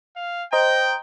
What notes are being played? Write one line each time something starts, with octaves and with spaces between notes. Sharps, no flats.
F5
C5 D#5 G5 A#5